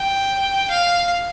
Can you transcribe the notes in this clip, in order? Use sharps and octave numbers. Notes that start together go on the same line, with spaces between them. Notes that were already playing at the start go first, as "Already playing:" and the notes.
Already playing: G5
F5